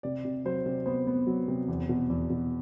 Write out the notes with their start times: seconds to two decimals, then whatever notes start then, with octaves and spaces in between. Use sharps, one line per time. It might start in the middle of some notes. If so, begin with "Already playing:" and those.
0.03 C3 D5
0.25 C3
0.45 F#3 C5
0.66 C3
0.86 B3 C5
1.07 B3
1.27 F#3
1.48 C3
1.68 E2
1.89 B2
2.10 E2
2.30 B2